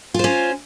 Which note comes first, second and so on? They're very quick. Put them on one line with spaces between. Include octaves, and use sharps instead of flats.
F4 C5 C#4